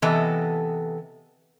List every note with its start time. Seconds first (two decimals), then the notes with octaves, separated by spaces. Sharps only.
0.02 C3 E3 B3 A4 D#5